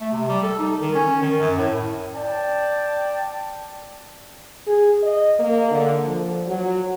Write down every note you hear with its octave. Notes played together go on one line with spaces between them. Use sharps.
A3
C3
G3
A4
D#4
D#3
C#4
D#3
F#2
A2
D5 G5 A5
G#4
D#5
A#3
D3
F3
F#3